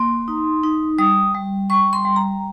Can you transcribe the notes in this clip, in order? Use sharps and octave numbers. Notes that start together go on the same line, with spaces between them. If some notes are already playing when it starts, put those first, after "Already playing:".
Already playing: A#3 C6
D#4
D#4
G3 D#6
G3
G3 C#6
C6
G3
A#5